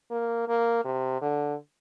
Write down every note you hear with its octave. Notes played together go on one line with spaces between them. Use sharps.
A#3
A#3
C3
D3